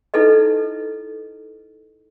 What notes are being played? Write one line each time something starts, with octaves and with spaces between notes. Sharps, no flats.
D#4 E4 A4 B4 D#5